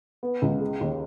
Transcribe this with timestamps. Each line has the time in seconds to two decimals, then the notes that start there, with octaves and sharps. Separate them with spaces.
0.23 B3
0.42 C#2
0.61 G#3
0.81 D#2